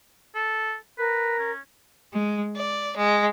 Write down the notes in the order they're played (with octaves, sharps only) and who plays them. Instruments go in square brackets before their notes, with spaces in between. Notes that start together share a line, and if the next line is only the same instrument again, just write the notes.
[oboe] A4
[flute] A#4 [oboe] B4
[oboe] C#4
[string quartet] G#3
D5
G#3